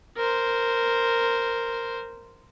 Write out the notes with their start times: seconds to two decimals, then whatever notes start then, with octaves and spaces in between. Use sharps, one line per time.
0.17 A#4 C5